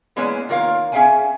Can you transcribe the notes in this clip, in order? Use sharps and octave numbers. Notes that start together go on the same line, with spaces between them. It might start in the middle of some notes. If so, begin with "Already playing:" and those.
E3 G#3 A#3 B3 C#4
D#3 A#3 F4 A#4 C#5 F5
C#4 G#4 E5 F5 G5 G#5